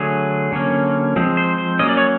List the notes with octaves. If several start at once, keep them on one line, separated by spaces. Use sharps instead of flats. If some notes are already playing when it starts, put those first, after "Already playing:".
Already playing: D3 F#3 A3 G#4
D3 F#3 A#3 C#4
F3 G#3 C4
C5
C5
F#3 A#3 C#4 D#5
D5
C#5